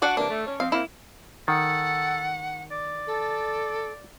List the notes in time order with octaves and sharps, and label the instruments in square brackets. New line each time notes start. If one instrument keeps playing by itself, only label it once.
[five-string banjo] D4 F#4 D5 [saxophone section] F#5
[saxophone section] C3 E3 A#3 [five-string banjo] D4
[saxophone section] A3
C#4 C#5
[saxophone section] F3 C4 [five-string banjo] F5
[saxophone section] A#3 C4 [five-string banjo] E4
[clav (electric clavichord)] D#3 [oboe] A4 [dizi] F#5
[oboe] D5
[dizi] A4